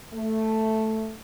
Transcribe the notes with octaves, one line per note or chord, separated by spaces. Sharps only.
A3